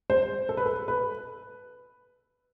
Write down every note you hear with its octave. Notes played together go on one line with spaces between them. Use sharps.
C5
A4
B4
A4
B4